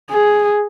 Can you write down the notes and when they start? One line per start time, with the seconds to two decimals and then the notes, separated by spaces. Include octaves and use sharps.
0.11 G#4